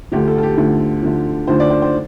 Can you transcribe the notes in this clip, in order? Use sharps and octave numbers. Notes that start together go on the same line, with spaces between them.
D2 D3 F3 G4
A4
A4
G4
D2 D3 F3
D2 D3 F3
D2 D3 F3 C5
D5
C5
C5